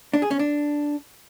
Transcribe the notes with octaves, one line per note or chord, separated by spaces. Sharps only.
D4
G#4
C#4
D4